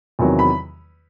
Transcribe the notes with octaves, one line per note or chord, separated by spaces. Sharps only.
E2 C3 D#3 F#3
B5